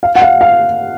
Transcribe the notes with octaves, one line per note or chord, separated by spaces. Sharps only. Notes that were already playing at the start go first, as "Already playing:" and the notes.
F5
F#5
F5
F5